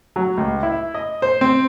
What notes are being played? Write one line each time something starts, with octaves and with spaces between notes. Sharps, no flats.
F#3
C#2
E4
D#5
C5
C4